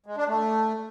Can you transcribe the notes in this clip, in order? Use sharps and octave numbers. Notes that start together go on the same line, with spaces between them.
G#3
D4
A3